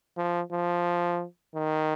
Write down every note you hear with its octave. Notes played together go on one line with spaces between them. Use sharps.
F3
F3
D#3